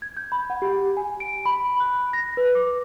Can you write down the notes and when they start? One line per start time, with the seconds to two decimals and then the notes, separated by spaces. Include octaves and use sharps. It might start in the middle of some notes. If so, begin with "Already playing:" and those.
0.02 G#6
0.17 G6
0.32 B5
0.50 F#5
0.62 G4
0.97 G#5
1.20 D7
1.45 B5
1.80 F#6
2.13 A#6
2.37 B4
2.55 D6